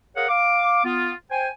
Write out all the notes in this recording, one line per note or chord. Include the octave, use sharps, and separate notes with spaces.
G#4 A#4 C#5 F5 F#5
F5 D6
B3 F4
C5 G5 G#5